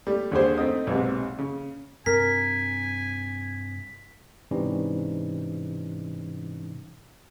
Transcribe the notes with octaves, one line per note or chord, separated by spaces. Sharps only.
G3 A3
D#2 D3 G3 G#4 C5
A3 C4 D#4 D#6
B1 G#2 C3
C#3
G2 C3 A#4 G#5 B6
G#2 C3 E3 G3 C#4 D#4